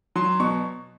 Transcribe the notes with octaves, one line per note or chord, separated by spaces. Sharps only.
F#3 C6
B2 C#6